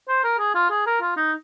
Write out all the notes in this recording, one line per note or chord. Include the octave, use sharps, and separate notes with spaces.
C5
A#4
G#4
F4
G#4
A#4
F4
D#4